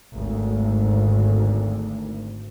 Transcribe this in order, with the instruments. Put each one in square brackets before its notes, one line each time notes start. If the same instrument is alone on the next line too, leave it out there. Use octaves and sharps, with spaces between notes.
[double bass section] G#1 D2